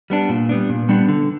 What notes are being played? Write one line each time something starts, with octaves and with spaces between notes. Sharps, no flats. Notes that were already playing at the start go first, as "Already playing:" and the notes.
G3 B3 D4
A#2
G3 B3 D4
A#2
G3 B3 D4
D3